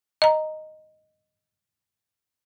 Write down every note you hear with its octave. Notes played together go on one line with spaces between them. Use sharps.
D#5 A#5